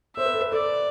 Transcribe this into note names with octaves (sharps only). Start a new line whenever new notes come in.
C5 E5
B4
A4
B4
A4 D5